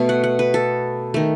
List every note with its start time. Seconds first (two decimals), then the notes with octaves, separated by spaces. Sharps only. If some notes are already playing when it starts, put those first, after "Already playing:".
Already playing: B2 A3
0.09 F#5
0.24 F#5
0.39 B4
0.54 A4
1.14 D#3 A3